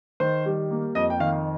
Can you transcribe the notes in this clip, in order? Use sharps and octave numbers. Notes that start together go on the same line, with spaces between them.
D#3 C5
G3
A#3
F2 D#5
G5
D#3 F5